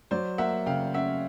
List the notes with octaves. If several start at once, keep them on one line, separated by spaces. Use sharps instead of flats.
F#3 C5 D5
A#3 E5 F#5
C#3 F5 G5
C#4 E5 F#5